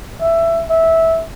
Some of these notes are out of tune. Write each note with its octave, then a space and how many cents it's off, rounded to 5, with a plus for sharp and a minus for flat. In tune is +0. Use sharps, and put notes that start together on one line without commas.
E5 +15
E5 -15